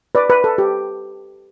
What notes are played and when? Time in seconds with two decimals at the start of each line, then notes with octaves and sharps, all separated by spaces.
0.15 B4 D5
0.30 B4
0.44 A4
0.58 G4